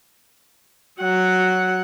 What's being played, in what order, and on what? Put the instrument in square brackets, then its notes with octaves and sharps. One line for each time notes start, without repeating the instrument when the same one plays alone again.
[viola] F#3 F#5